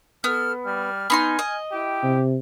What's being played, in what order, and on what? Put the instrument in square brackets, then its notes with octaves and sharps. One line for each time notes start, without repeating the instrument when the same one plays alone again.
[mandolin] B3 [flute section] A4 F6
[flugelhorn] G3 [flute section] F6
[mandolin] B3 D#4 C6 [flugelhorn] G#5
[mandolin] D#5
[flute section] E4 G5 [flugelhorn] G4
[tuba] C3